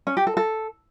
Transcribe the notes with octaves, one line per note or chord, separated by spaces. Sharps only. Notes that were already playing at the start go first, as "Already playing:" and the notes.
C#4
G4
A4
A4